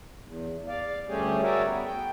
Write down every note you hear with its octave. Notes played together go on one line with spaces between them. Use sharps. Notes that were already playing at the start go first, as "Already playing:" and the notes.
E2
D5 F5
D2 G3 A3 C#4 G4 G#4
F#4 G#4 A#4 C#5 D5 E5
B3
G5